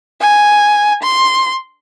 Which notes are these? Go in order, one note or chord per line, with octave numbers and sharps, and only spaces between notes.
G#5
C6